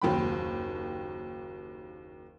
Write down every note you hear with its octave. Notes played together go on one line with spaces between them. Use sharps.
F#1 D#2 F#3 G5 B5